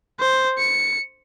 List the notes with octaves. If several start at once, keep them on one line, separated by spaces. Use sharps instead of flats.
C5
C#7